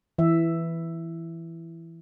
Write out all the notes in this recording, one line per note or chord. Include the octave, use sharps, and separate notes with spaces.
E3 E5